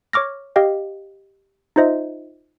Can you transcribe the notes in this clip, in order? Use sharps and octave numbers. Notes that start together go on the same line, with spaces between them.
C#5 C#6 D6 F6 A#6
G4 D#5 F5 G5
D#4 F4 C5 D#5 E5